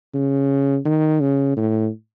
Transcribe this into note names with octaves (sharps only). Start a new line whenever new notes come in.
C#3
D#3
C#3
A2